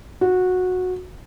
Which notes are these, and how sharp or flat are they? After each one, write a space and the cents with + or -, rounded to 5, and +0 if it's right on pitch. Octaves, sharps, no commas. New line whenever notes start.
F#4 -15